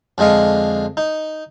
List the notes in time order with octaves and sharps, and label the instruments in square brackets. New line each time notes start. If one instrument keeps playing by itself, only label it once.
[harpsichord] F2 D3 G#3 D#5 F5
D#4